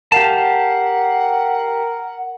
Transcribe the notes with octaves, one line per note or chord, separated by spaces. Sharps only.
G4 A#4 F5 F#5 A5